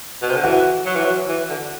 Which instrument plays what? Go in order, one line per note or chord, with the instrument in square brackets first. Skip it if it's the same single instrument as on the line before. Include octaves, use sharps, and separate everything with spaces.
[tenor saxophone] B2
C3
D3
[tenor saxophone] E3 [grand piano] F#4
[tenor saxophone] F#3
E3
F#3
E3
D3